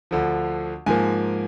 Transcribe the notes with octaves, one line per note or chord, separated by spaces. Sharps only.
D2 D3 F3
G#2 F3 A#3 G#5